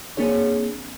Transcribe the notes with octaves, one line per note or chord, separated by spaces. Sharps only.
A#3 C4 D4 G#4 C#5